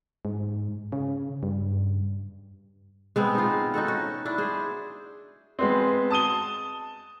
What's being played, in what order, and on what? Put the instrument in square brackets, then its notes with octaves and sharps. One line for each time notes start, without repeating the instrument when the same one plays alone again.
[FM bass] G#2
C#3
G2
[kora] G#3 B3 C4
D#4 F4
D#4 F#4 A4 F#5
C#4 F#4
D4 E4
G#4 C5
[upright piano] G#3 B3 C4
A5 D#6 D#7 G7